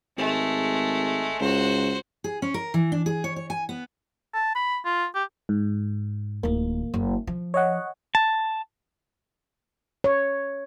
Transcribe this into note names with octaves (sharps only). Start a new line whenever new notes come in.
G#1 G#3 A3
C#2 F#4 C5
G#4
C#4
A#4
E3
D4
G#4
C#5
C#5
G#5
B3
A5
B5
F4
G4
G#2
D1 D#3 A#3
F#1
F3
C#5 D#5 F#5
A5
C#5